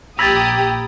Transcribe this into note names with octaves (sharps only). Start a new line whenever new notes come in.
A#1 G4 A#5 B5 D#6 E6 G#6 A6